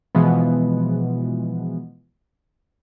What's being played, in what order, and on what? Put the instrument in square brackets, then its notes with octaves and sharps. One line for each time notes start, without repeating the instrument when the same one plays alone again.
[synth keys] B2 E3 F3 G#3 B3